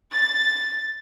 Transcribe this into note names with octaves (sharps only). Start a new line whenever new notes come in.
A6